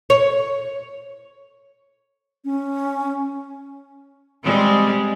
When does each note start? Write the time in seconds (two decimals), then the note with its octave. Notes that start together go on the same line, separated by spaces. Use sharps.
0.10 C#5
2.45 C#4
4.44 G3 G#3 C4